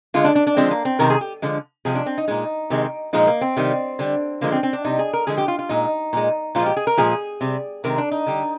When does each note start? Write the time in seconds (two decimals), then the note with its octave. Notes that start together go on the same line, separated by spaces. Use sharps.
0.14 D3 G#3 F4
0.24 D4
0.35 D4
0.47 D4
0.57 D3 F3 G#3 C4
0.71 A#3
0.85 C4
0.99 C3 D#3 G#3 A#4
1.10 G#4
1.21 G4
1.42 D3 F3 G#3
1.85 C3 F3 G#3 G#4
1.95 D4
2.06 C4
2.18 D#4
2.28 A#2 G#3 D#4
2.70 C3 D#3 G#3
3.13 A#2 F3 G#3 D#4
3.27 A#3
3.41 C4
3.57 C3 D#3 G3
3.99 D3 G3
4.41 D3 F3 G#3 A#3
4.52 C4
4.63 C4
4.73 D4
4.85 C3 G3 D#4
4.99 G#4
5.13 A#4
5.27 D3 F3 G#3 G#4
5.38 G4
5.48 F4
5.59 F4
5.69 A#2 G#3 D#4
6.13 A#2 G#3
6.55 A#2 F3 G#3 F4
6.66 G4
6.77 G#4
6.87 A#4
6.97 A#2 F3 G#3 G#4
7.41 C3 G3
7.84 C3 D#3 G#3 A#4
7.98 D4
8.12 D#4
8.26 D3 G3